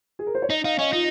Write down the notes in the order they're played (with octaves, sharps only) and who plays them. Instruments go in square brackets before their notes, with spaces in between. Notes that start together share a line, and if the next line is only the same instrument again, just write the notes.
[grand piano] G#4
A#4
C5
C#5
[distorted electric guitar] D#4 [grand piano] D#5
[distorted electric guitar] D#4 [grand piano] F5
[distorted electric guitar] C#4 [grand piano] D#5
[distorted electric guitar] D#4 [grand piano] F4